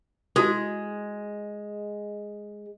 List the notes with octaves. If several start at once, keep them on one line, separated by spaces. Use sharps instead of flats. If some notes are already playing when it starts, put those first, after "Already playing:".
G#3 E4 F#4 A4